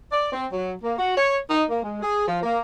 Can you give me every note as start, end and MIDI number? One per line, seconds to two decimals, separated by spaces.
0.12 0.31 74
0.32 0.45 60
0.53 0.73 54
0.82 0.93 58
0.97 1.13 66
1.16 1.37 73
1.50 1.64 63
1.68 1.81 58
1.83 1.99 56
2.01 2.25 68
2.26 2.39 53
2.43 2.61 58